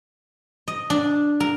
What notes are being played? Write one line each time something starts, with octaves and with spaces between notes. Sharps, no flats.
D#5
D4
A#4